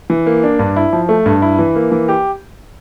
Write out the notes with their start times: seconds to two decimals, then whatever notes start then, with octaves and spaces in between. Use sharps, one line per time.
0.10 E3
0.26 A#3
0.43 D4
0.59 G2
0.76 E4
0.93 F3
1.09 A3
1.26 G2
1.42 E4
1.59 E3
1.76 A#3
1.92 E3
2.08 G4